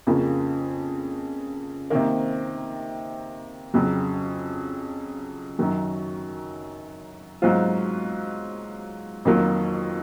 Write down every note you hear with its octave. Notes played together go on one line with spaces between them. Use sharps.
F2 C#3 F3 A#3
C3 D#3 A#3
F2 C#3 F#3
F#2 D#3 F#3
G#2 F#3 C4 F4
F2 D#3 F#3 A#3 F4